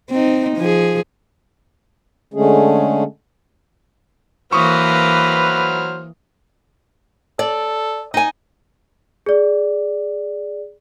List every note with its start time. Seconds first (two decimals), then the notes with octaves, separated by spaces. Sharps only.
0.10 C4 D#4
0.57 F3 G#4
2.34 D3 G#3 A3 C#4 G#4
4.52 E3 F#3 A#3 B4 C5 C#6 D#6 F6
7.39 A4 D5
8.14 D#4 G#5
9.26 G#4 D5